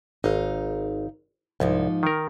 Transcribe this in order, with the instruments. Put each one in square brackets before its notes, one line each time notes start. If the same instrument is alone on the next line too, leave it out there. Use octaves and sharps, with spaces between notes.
[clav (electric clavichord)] G#1 [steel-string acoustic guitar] D#4 F5
[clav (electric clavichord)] C2 [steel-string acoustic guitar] G#2 F3 D#4
[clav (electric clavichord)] D#3 A#4